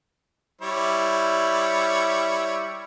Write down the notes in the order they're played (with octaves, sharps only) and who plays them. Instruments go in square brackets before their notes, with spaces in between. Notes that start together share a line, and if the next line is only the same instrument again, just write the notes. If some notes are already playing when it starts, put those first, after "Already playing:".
[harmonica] G3 E4 C#5